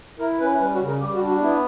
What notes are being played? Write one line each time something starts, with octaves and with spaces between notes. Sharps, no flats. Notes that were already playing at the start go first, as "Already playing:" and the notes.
E4 A#4
C#4 B4
G3 B4
F#4
C#3
A#4
G3 G4
F#4
D4
F#4
B3 E4